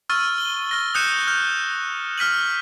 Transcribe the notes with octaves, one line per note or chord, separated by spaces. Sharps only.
C#6 E6 F6 A6 D#7
G7
F6 A#6 G7
D#6 F#6 G6 C#7 D#7 E7
F6 G6
F6 B6 D#7 F#7